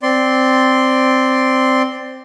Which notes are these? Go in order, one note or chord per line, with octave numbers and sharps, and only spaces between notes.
C4 D5 C6